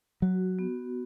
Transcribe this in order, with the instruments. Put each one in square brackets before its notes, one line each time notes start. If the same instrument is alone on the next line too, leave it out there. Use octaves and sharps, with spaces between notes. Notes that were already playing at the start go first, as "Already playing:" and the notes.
[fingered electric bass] F#3 [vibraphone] F#4
[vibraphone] B3